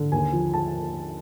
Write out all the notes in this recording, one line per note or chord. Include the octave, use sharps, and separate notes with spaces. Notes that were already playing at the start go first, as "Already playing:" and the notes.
Already playing: D3
D#2 G#5
F3
A5